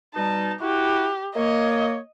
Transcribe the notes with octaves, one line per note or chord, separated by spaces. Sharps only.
B2 G3 D#4 A5
E4 F#4 G4
A#3 C#5 D#5